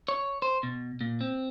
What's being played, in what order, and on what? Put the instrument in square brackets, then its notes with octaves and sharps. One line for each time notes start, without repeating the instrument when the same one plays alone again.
[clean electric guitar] C#5
C5
B2
A#2
C4